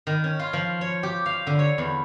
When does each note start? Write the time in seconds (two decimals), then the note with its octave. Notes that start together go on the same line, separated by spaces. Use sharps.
0.07 D#3
0.24 C#4
0.39 F4
0.53 F3
0.81 C#5
1.03 G4
1.26 F5
1.47 D3
1.59 C#5
1.78 E2